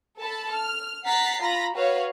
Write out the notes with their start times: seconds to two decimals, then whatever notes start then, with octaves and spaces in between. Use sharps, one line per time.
0.19 A4 A5 B5
0.52 F6
1.05 F#5 A#5 A6 B6 C7
1.42 F4 A#5 B5 A#6
1.75 F#4 B4 C#5 F5